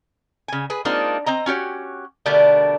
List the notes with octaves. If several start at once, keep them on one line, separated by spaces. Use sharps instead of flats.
C#3 G#5
G#4 B4
G#3 A#3 C4 D4 D#4 F4
C4 D#5 A#5
C#4 F#4 G4 C#5
B2 D3 G3 A3 D4 A#4